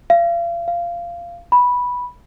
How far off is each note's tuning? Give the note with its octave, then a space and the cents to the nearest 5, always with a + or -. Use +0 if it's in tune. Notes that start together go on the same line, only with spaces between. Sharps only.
F5 -35
F5 -15
B5 -10